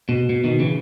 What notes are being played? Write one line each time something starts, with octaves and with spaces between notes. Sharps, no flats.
B2
B2
B2 D#3
C#3 E3